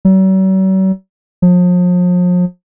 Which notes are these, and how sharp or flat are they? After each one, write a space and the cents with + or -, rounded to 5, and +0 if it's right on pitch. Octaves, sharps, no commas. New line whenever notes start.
F#3 +45
F3 +40